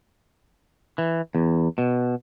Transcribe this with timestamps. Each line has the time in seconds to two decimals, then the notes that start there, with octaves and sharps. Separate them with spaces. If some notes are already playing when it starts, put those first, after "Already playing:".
0.98 E3
1.35 E2
1.78 B2